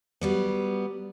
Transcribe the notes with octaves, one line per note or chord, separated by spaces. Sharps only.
F#3 G3 B3